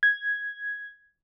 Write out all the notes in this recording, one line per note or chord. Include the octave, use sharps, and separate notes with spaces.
G#6